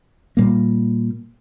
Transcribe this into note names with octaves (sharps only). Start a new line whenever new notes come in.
A#2 G3 A#3